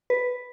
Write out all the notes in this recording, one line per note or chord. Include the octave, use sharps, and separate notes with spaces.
B4